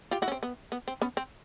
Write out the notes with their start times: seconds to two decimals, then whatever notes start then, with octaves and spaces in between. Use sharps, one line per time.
0.11 F4 G4
0.22 E4 F#4
0.28 C#4
0.32 C4
0.43 B3
0.72 B3
0.88 C4
1.02 B3 C#4
1.17 C4